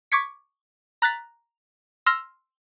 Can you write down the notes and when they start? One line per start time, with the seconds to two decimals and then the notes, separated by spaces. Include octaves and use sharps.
0.12 C#6 D6 G#6 B6 C#7
1.02 A#5 F#6 A6 B6
2.06 C6 E6 F6 A#6